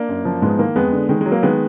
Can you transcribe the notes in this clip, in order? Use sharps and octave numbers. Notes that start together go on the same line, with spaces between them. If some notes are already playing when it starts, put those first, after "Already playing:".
Already playing: A#3 D4
F#2
F3
G#2 G#3 B3
D#3 A#3
F2 G#3 B3
D3
D#3 G#3
F#3 G#3
A#3
D#3 G#3 B3